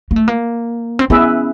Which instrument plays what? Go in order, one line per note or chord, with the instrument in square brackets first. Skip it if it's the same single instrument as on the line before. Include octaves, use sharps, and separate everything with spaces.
[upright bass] A#3
A3
A#3
C4
[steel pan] B3 E4 G#4 B4 E5 [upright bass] C#4